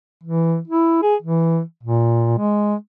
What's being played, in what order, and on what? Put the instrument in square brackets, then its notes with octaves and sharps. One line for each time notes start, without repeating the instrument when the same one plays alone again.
[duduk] E3
E4
G#4
E3
A#2
G#3